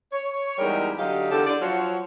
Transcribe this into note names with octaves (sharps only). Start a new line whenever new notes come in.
C#5
E2 G3 G#3 D#4 A#4
D3 F#3 D#4 G4 F5
E2 D3 G4 A4
D3 D5
F3 F#3 F4 F#4 C#5